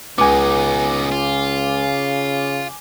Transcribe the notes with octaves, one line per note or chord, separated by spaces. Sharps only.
C#2 C#3 B3 D#4 G#5 D6
F4